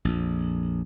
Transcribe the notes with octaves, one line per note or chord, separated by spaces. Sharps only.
A#1 F2